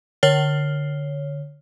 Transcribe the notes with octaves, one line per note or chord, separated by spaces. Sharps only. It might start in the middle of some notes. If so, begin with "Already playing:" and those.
D3 C#5 F6 C7 G7